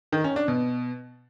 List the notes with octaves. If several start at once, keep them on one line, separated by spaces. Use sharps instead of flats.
D#3
C#4
D4
B2